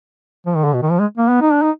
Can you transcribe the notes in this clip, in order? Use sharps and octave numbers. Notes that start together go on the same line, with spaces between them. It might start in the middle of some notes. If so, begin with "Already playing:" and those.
F3
D#3
D3
B2
D#3
F3
G#3
A#3
B3
D#4
D4
D#4